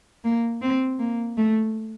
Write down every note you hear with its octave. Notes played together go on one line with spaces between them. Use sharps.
A#3
C4
A#3
A3